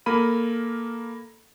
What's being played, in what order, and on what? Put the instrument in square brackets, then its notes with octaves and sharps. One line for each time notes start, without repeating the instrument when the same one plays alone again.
[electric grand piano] A#3 A4 A#4 B5 D#7